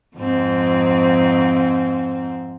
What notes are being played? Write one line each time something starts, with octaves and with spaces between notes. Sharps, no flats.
F2 G#2 C4